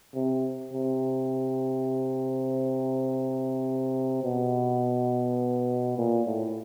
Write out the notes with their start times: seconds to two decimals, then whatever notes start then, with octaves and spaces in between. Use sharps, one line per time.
0.15 C3
0.73 C3
4.23 B2
5.98 A#2
6.26 A2